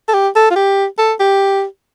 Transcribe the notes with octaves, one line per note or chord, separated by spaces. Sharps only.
A4
G4
A4
F4
G4
A4
G4